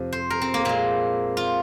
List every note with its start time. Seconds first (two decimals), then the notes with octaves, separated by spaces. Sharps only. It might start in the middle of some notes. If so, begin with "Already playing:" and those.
Already playing: F2 C3 F3
0.12 C5
0.30 A#4
0.42 C4
0.54 A#3
0.65 A#2 G#3 C4
1.37 F4